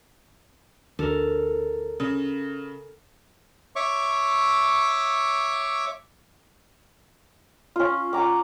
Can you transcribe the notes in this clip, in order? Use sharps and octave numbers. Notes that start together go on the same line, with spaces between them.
D2 A4 A#4
C#3
C#5 E5 C#6 D6
C#4 F4
F#5 G#5 A#5 D6